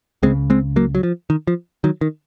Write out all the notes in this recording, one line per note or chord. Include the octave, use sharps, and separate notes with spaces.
C#2 C#3 G#3 C4
G#3 C4
F#3 A#3
F#3
F3
D#3
F3
D#3 F#3
D#3